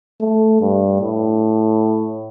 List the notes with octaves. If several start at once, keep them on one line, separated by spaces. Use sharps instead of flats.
A3
G2
A2